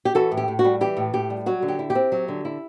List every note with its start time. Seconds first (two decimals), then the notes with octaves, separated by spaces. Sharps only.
0.05 G4
0.15 E3 F#4 A4
0.31 A2
0.37 G4
0.48 A2
0.59 F#4
0.65 G3
0.81 E3 G4
0.97 A2
1.13 A2 G4
1.30 G3
1.46 F#3 F#4
1.62 D3
1.68 G4
1.79 E4
1.90 G4
1.95 C4
2.12 F#3
2.28 D3
2.45 E4